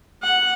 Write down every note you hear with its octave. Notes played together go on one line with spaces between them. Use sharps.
F#5